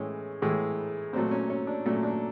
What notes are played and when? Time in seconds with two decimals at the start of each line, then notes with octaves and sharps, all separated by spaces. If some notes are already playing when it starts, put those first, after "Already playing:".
Already playing: A2 E3 G#3 C#4
0.42 A2 E3 G#3
1.13 A#2 F#3 A3 C4
1.31 C#4
1.50 C#4
1.67 D4
1.86 A#2 F#3 A3 C#4
2.03 D4